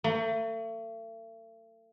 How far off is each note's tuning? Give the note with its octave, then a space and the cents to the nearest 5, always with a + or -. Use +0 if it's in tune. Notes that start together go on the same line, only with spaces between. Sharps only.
A3 +40